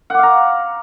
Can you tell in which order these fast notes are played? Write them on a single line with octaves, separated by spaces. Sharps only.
F#5 D6 F5 A#5